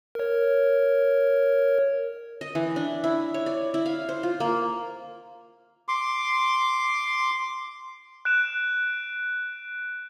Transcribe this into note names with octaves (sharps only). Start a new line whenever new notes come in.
A#4 C#5
D#5
E3
D4
E4
C#5
D5
E4
F5
C5
F4
A#3
C6 D6
F#6 D7 E7